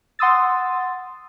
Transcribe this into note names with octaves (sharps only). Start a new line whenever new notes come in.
F#5 C6 D#6 E6 A6